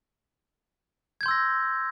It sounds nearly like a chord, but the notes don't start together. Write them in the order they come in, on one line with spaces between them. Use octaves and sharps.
G#6 G6 C6 E6 A#6